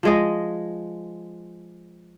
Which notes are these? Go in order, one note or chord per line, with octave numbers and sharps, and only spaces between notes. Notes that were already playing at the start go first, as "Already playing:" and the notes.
F3 G#3 D#5